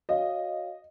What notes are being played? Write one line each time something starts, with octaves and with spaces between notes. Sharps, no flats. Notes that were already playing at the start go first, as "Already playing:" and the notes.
F#4 C#5 D#5 F5